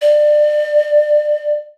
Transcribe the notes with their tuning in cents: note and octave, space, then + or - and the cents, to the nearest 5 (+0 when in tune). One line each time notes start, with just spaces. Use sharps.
D5 +30